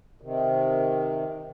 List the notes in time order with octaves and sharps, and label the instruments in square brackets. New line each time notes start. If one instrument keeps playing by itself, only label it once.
[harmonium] C3 D#3